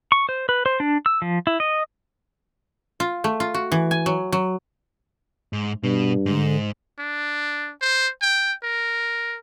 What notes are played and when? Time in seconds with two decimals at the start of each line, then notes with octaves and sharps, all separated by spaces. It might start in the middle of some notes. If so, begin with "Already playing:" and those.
0.12 C#6
0.29 C5
0.49 B4
0.66 C5
0.80 D4
1.06 E6
1.22 F3
1.47 E4
1.60 D#5
3.00 F4
3.24 A3
3.40 F4
3.54 F#4
3.72 E3
3.91 G#5
4.06 F#3
4.32 F#3
5.53 G#2
5.83 G2 B2
6.26 G#2 D3
6.99 D4
7.81 C5
8.22 G5
8.63 A#4